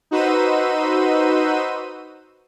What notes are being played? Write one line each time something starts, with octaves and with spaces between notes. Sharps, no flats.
D#4 F#4 B4 C5 E6 D#7